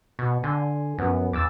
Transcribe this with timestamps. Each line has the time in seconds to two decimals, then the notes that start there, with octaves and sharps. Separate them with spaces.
0.19 B2 C#6
0.43 D3 G#5 C6
0.98 F#2 F3 B3 C#4
1.33 E2 D6 E6 A6